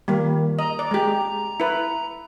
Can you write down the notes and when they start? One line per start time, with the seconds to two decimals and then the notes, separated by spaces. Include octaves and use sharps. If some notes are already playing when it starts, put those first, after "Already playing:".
0.08 D#3 G3 A#3
0.59 D#5 A#5
0.79 D5
0.91 G#3 G4
1.60 E4 B4